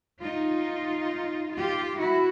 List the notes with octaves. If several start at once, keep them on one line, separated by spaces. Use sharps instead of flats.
D#4 F4
F4 G4
E4 F#4